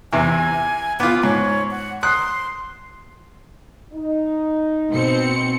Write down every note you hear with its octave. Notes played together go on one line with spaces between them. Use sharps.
E2 C3 E3 G#5
B3 F4 D6
G#2 C#5
F#5
C6 D#6 F#6
D#4
B2 C4 C#7